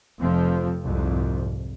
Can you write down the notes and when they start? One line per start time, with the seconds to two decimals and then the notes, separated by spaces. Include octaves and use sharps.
0.19 F1 F2 F3 C4
0.84 C2 F2 G#2